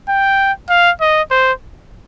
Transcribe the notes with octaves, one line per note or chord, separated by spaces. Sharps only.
G5
F5
D#5
C5